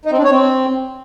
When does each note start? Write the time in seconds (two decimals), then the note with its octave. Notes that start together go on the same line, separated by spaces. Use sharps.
0.05 D#4
0.12 C4
0.18 D4
0.24 C#5
0.31 C4